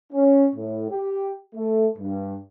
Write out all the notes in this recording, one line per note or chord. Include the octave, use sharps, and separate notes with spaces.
C#4
A2
G4
A3
G2